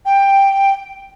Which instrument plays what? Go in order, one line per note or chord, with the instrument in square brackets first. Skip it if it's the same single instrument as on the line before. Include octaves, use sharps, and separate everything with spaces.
[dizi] G5